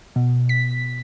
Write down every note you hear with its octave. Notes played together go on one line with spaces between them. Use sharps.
B2
B6